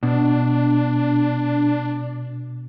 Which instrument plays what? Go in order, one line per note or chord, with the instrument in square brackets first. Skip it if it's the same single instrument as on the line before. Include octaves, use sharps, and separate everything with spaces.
[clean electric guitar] B2 [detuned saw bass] D4